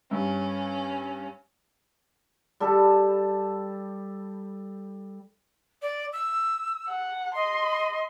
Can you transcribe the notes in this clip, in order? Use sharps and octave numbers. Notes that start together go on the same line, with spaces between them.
G2 C#4
G3 A4
D5
E6
F#5
D#5 C6